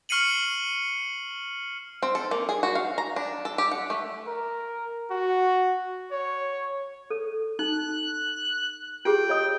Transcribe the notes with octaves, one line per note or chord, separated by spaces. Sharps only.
C#6 F6 C7 C#7 D#7 F#7
C4
A4
A#3
G#4
F#4
F5
A#5
D4
A4
G4
F#5
A3
A#4
F#4
C#5
A4
D#4 F#6
F4 G4 G#4 G5
C#5 D#5 D#6